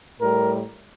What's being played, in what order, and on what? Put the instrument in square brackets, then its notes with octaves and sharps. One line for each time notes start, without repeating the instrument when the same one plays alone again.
[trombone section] A2 G3 A#4